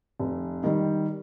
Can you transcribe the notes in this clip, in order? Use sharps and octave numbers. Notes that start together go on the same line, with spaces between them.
F1
D#3 G3